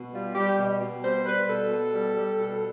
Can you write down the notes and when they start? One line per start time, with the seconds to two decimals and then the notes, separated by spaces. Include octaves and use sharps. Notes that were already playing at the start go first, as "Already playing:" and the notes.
Already playing: B2
0.13 G3 F4
0.35 G3 G4
0.58 B2
0.80 B2
1.03 G3 C5
1.25 G3 B4
1.48 B2 A4
1.70 B2
1.93 G3
2.16 G3
2.38 B2